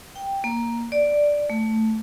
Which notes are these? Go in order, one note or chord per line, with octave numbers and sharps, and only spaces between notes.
G5
A#3
D5
A3